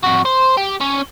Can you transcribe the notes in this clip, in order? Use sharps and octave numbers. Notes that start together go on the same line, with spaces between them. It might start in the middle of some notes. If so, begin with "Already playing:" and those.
F2 F#4
C5
G4
C#4